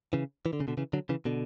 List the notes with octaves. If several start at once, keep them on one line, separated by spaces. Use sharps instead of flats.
C#3 E3
E3
D3
C#3
B2 D3
C#3 E3
D3 F#3
C#3 E3
B2 D3